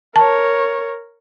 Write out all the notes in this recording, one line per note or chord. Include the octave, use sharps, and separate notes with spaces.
A#4 C#5 A5